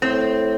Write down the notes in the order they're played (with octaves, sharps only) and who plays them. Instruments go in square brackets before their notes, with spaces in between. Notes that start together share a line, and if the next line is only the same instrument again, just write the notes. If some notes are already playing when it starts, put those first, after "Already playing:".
[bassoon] A2 [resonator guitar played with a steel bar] C4